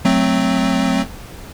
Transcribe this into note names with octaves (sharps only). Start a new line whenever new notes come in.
F#3 A3 C4